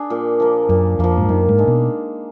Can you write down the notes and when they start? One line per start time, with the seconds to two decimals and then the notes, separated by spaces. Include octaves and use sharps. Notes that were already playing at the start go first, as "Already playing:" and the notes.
Already playing: D4 G#4
0.10 A#2
0.40 F3 A#3
0.69 F#2 A#2
0.99 F2 F3 A#3
1.18 G#2
1.28 F#2 D#3
1.49 G#2
1.58 G#3 D4
1.67 B2